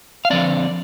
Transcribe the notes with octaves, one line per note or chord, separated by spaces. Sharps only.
F5
D3 F3 C4 D5